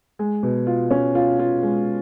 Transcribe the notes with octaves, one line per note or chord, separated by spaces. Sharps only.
G#3
B2
F4
C#4
F4
F4
G#3